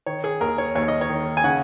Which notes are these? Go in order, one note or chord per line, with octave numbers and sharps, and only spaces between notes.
D#3 C#5
G#4
D#2 A#4
C#5
D#2 C#5
D#5
C#5
D#3
G#5
C#3 F#5